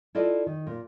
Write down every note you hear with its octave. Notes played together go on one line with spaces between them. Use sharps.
E4 F4 A4 B4 D5 D#5
D#3
A#2